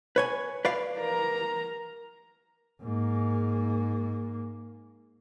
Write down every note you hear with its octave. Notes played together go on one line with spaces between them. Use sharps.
B4 C#5 G#5
B4 D5 F5
A#4 A#5
G#2 A#3